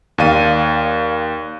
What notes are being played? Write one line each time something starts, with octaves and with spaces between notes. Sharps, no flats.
D#2 D5 F5 D#7